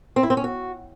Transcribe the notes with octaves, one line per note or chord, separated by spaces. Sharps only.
C4
E4
C4
C#4
F#4